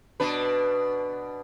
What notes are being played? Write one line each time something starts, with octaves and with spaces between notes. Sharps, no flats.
B2 D4 B4